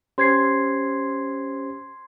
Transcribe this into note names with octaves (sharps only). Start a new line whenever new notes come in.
C#4 G4 C5 C6 G#6 C7